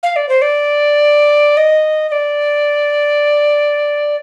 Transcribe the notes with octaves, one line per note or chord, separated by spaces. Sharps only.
F5
D5
C5
D5
D#5
D#5
D5